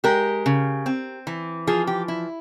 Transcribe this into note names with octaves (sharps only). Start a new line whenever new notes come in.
G#3 G4 A#4
C#3
C4
E3
F3 F4 G#4
G4
E4